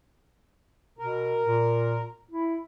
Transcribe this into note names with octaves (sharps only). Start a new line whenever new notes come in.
B2 A#4
A#2
E4